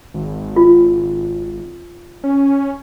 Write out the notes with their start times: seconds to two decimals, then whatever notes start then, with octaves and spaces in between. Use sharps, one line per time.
0.14 G#1
0.56 F4
2.24 C#4